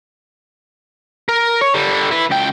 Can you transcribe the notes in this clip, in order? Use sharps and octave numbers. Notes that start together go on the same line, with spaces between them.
A#4
C#5
D3 G3
E4 B4
C#2 G5